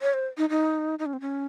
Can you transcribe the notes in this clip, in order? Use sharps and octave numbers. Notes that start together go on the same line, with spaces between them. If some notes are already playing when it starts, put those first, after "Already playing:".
C#5
C5
D#4
D#4
D#4
C#4
C4
C#4